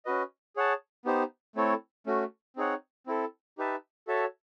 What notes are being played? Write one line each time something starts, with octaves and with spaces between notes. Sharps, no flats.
C#4 F#4 B4 D#5
G#4 C#5 F#5 A5
B3 D#4 G4 C5
A3 C4 E4 A4 C#5
A3 C#4 F#4
C4 D#4 G#4 C#5 F#5
C4 E4 A4
D#4 G4 B4 E5 A5
F#4 A4 C#5 E5 A5